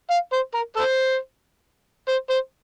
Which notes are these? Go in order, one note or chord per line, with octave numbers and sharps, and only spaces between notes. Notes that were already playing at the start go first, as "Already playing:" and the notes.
F5
C5
A#4
A4 C5
C5
C5